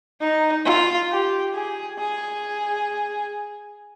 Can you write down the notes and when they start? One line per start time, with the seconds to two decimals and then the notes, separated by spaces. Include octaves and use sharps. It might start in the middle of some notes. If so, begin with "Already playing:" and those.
0.21 D#4
0.65 F4
1.10 G4
1.54 G#4
1.98 G#4